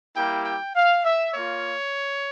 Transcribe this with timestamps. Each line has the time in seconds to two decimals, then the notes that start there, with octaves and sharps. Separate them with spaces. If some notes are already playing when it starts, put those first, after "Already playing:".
0.15 G3 A#3 E4 G4 G5
0.45 G5
0.75 F5
1.04 E5
1.34 A#3 F4 C#5